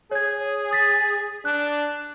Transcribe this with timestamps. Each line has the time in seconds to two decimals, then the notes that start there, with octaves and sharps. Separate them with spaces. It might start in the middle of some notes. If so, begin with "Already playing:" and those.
0.11 G#4 C#5 G#6
0.71 D#6 A6 B6
1.45 D4 F#6